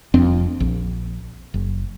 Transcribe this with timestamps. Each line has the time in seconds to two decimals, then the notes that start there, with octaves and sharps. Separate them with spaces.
0.14 F1 F2 C4 D4
0.60 A#1
1.54 F#1